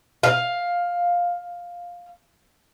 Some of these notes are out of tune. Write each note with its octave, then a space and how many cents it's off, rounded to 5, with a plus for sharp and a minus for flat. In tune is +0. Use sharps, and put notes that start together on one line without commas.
F5 +10